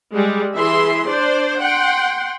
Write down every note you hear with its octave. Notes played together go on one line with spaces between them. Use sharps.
G3 G#3
E3 G#4 E5 C6
D4 C5 D5
F#5 G5 C6